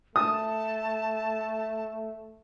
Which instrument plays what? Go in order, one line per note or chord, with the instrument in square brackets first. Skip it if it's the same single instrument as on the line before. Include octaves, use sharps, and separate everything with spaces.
[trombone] A3 [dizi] A5 [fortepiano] D#6